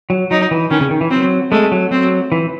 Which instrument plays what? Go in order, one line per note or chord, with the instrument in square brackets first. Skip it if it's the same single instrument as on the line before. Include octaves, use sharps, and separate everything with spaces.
[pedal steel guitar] F#3
[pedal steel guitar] F#3 [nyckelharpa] D#4
[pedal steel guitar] E3
[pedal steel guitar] D#3 [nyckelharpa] C#4
[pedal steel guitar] C#3
D#3
E3
[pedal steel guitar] F#3 [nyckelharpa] C4
[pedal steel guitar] G#3 [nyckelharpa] A3
[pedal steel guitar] F#3
[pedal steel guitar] F#3 [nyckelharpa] C4
[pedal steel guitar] E3